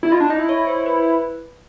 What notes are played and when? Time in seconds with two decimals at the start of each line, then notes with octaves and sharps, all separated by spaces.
0.03 E4
0.11 F4 D#5
0.20 D4
0.30 D#4 D#5
0.39 E4
0.49 C#5
0.67 C5
0.86 B4